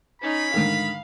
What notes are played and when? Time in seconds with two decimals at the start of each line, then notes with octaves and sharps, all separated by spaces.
0.22 C#4 D#4 B5
0.54 G#2 D3 D#3 F5